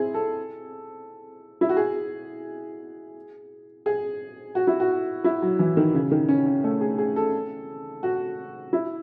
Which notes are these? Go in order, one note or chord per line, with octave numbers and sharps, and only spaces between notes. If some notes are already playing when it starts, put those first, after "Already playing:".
Already playing: C4 E4 G#4
A4
E4
F#4
G#4
G#4
F#4
E4
F#4
E4
F#3
E3
D#3
C#3
D#3
C#4
C#4
A3
G#4
G#4
A4
F#4
E4